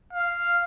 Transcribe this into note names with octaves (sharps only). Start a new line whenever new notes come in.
F5